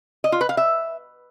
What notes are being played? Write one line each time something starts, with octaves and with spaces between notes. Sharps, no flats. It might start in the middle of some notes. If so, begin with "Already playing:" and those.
D#5
F4
B4
F5
E5